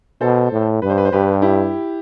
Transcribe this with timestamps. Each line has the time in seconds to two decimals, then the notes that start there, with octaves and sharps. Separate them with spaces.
0.21 B2 A4 C5
0.52 A2
0.82 G2 B4
0.90 C5
0.98 B4
1.05 C5
1.12 G2 G4 B4
1.42 E4 G4